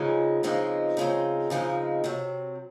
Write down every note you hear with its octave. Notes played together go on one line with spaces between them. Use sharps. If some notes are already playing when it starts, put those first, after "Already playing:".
Already playing: C#3 F3 G#3 C4 D#4
C#3 F3 G#3 C4 D#4
C#3 F3 G#3 C4 D#4
C#3 F3 G#3 C4 D#4
C3 F#3 C4